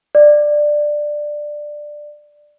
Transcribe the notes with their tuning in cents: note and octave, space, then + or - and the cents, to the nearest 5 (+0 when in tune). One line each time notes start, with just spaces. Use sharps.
D5 +10